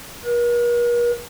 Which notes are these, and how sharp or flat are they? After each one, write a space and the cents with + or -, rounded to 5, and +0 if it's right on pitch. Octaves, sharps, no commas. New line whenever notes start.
A#4 +45